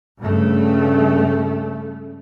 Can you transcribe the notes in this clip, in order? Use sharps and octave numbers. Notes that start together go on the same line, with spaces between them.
G2 C#3 A3